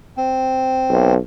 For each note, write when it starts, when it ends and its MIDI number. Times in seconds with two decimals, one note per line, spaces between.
0.17 1.14 60
0.89 1.17 35